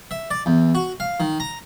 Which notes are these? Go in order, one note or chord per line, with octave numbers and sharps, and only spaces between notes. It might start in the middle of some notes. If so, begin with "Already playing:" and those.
E5
D5
E2
F#4
F5
D#3
A#5